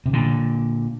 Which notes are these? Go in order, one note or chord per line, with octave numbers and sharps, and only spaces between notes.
C3
A#2 D3